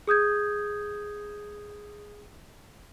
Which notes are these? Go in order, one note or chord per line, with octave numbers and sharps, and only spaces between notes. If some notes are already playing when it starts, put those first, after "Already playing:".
G#4 D#6 G6 G#6